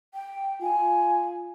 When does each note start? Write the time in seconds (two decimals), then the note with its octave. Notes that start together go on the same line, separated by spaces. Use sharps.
0.14 G5
0.62 F4 G#5